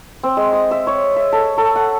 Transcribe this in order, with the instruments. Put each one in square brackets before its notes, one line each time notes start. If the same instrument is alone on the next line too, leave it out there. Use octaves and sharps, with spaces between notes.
[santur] C4
G#3
D#6
E5
C#5
E5
A4
A4
F#5